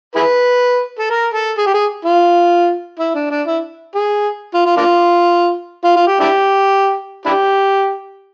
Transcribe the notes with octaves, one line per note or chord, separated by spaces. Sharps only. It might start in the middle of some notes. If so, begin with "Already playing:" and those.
E4 G#4 B4
A4
A#4
A4
G#4
G4
G#4
F4
E4
D4
D4
E4
G#4
F4
F4
A#3 D4 F4
F4
F4
G4
D4 E4 G4
D4 E4 G4